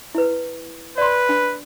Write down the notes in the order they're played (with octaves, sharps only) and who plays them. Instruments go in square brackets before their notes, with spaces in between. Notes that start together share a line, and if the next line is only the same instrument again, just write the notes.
[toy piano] E4 B4
[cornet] B4 [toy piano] D5 C6
[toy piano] D4